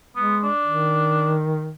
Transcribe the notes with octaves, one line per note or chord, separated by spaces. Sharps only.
G#3 B3
D4
D#3